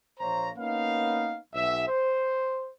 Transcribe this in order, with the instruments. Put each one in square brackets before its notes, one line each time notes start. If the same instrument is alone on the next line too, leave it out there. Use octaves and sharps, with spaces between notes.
[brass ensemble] A#1 A#3 C5 C#5 A#5
A#3 B3 C#4 D#4 B4 F5
B1 E5
C5